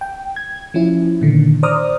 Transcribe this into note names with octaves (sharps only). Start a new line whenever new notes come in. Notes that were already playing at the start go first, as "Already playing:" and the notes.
G5
G#6
F3 C#4 E4
A#2 D3 D#3
C5 D5 A#5 D6 D#6 F6